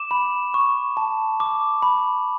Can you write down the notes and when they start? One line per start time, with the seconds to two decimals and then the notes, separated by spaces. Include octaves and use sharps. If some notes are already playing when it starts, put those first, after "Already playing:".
Already playing: D6 E7
0.11 B5
0.54 C#6
0.97 A5
1.40 D6
1.82 B5